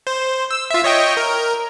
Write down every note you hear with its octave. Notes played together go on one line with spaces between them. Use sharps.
C5
E6
F4 E5
C#5 D#5 G5
A#4